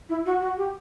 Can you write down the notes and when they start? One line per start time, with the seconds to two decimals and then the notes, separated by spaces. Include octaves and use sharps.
0.09 E4
0.26 F#4
0.41 F#4
0.57 G4